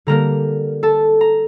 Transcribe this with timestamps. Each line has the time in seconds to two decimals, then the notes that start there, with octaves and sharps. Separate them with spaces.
0.07 D3 G3 A#3 A#4 A#5
0.83 A4 A5
1.21 A#5